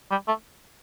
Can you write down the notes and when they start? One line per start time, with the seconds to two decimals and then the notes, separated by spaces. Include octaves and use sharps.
0.11 G3
0.28 A3